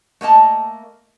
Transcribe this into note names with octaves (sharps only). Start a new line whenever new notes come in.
A3 A#3 D#5 A5